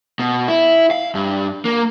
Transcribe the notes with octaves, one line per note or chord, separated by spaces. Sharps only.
B2
E4
F5
G2
A#3